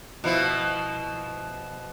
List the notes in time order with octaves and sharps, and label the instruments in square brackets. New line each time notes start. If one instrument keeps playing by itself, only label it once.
[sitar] B2 F3 E4